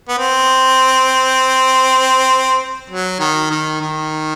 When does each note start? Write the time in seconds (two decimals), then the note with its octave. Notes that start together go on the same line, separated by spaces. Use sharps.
0.08 B3
0.18 C4
2.90 F#3
3.19 D#3
3.50 D#3
3.81 D#3